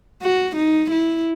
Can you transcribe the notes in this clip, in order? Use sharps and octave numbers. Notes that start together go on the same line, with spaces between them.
F#4
D#4
E4